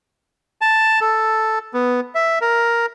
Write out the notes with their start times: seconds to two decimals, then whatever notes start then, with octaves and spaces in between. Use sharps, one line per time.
0.61 A5
1.01 A4
1.74 B3
2.15 E5
2.41 A#4